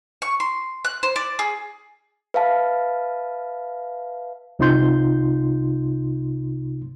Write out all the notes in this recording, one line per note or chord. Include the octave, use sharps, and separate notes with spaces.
C#6
C6
F#6
C5
D5
G#4
B4 E5 F5 A5
C2 C3 D#4 F4 C6 G6